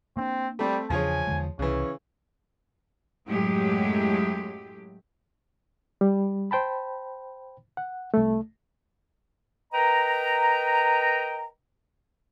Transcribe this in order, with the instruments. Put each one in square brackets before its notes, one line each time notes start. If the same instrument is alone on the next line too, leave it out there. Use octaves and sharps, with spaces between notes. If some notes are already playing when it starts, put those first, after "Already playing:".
[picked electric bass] A#3 D4 [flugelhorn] C4
[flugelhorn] G3 [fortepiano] A3 C4
[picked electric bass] E2 C#3 D4 [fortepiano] F3 G#4 C#5 [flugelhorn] G#5
[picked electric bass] E2 D3 G#3
[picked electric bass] C2 [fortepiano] C#3 E3 [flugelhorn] C#4
[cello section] F#2 A2 F#3 G#3 A3 G4
[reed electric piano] G3
C5 G5 A5 B5
F#5
C2 A3
[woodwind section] A#4 B4 D#5 G5 A#5